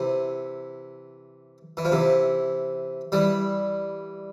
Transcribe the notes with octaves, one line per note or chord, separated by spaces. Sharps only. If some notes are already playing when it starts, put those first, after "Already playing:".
Already playing: C3 E3
E3
F3
C3 E3
E3 G3